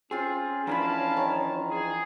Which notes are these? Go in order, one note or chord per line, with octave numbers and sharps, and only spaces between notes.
C4 C#4 F4 G#4
E3 F3 D4 A#4 F5 G#5 A5 B5
D#3
G#4